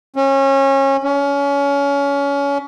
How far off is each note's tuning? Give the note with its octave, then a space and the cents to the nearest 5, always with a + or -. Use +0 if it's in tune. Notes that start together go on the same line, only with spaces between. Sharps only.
C#4 -25
C#4 +25